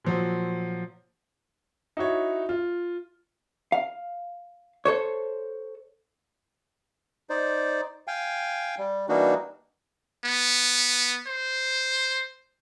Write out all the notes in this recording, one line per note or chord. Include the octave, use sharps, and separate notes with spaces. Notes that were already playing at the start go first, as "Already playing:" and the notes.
A#2 F3 F#3
D#4 E4 F#4 C#5
F4
F5
A4 C5 C#5
D#4 C5 D5
F5 G5 G#5
G3
E3 G3 A#3 D4 D#4 F#4
B3
C5